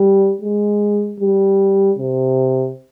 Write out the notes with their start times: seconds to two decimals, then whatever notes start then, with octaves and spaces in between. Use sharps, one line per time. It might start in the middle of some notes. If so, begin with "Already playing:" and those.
Already playing: G3
0.42 G#3
1.20 G3
1.99 C3